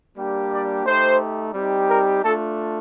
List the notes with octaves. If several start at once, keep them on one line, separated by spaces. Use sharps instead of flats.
G3 A#3 D4 G4
D5
A3 D#4 G4 C5
G3 C4 D#4 G4
A#4
A3 D4 F4 A4